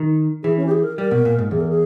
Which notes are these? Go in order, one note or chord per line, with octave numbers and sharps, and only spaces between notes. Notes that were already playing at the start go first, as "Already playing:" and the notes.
Already playing: D#3
E3 G#4
C#4
G4
G#4
A#4
G3 A#4
B2
A#2
G#2
E2 G#4
A#4
G#4